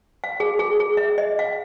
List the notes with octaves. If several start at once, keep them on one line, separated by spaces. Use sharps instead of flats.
F5
G#4
G#4
G#4
E5
D#5
F5